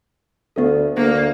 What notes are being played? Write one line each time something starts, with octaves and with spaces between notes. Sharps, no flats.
D2 B3 A4
D2 A#3